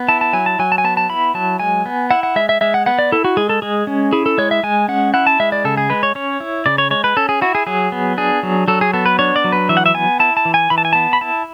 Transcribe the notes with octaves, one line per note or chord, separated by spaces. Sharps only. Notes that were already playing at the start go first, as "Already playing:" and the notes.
Already playing: B3
E4 A5
A5
F#3 G#5
A5
F#3 G#5
A5
G#5
B3 A5
A5
E4 B5
F#3 A5
G#3 G#5
B3
E4 F#5
F#5
G#3 E5
E5
G#3 E5
F#5
B3 F#5
D5
E4 A4
F#4
G#3 G#4
A4
G#3 G#4
C#4
E4 G#4
A4
G#3 C#5
E5
G#3 G#5
C#4 F#5
E4 F#5
A5
G#3 E5
D5
C#3 A4
G#4
G#3 B4
C#5
C#4 C#5
E4
C#3 D5
C#5
G#3 C#5
B4
C#4 A4
G#4
E4 F#4
G#4
F#3 G#4
B3
D4 G#4
F#3
F#3 A4
G#4
B3 A4
B4
D4 C#5
D5
F#3
B4
E3 E5
F#5
E5
B3 G#5
E4 A5
A5
E3
G#5
E3 B5
A5
G#5
B3 A5
B5
E4 A5